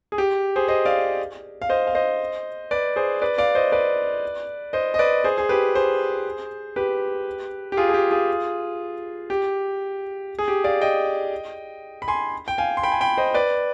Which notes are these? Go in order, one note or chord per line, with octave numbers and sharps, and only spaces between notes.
G#4
G4
G#4 C5
C5 D#5
D5 F5
F5
C5 D#5
F5
C5 D#5
B4 D5
G#4 C5
B4 D5
D5 F5
C5 D#5
B4 D5
C5 D#5
D#5
B4 D5
G#4 C5
G#4
G4 B4
G#4 C5
G4 B4
G4
F4 G#4
G#4
G4
F4 G#4
G4
G#4
G4
D5 F5
D#5 G5
B5
G#5 C6
G5
F5 G#5
C6
G5 B5
G#5
G5 B5
C5 D#5
B4 D5